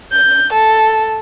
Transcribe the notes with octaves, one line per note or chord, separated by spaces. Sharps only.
G6
A4